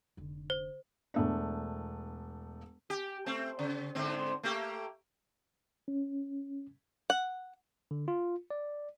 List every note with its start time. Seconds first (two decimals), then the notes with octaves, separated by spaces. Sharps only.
0.17 F1 D3
0.50 C5
1.14 E1 A3 D4
2.90 G4
3.26 A3 C4
3.59 C#3
3.95 G#2 D3 C4
4.43 A3 A#3 G4
5.88 C#4
7.10 F#5
7.91 D3
8.08 F4
8.51 D5